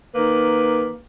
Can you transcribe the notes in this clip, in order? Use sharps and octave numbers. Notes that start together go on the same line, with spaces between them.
D#3 A#3 B4